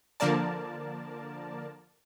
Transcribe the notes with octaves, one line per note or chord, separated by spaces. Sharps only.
D3 F3 A#3 A#4 D5 A5